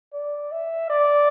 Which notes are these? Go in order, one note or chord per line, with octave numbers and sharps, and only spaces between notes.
D5
E5
D5